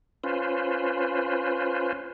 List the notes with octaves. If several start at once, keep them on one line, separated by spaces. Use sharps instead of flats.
C#4 F4 B4 C5